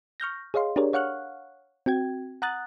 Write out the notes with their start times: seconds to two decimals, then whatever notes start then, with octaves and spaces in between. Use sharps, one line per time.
0.20 C#6 F6 G6 A#6
0.54 G#4 C#5 D#5 F5 C6
0.76 D4 G4 G#4 A#4 C#5 D5
0.93 C#5 F5 F#5 C#6 F6 F#6
1.86 C4 F#4 G5 G#6
2.42 F#5 A#5 D#6 F#6 A6